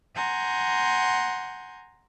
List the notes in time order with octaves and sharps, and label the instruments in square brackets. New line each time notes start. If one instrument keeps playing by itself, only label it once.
[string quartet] F#5 G#5 A#5 C6 G6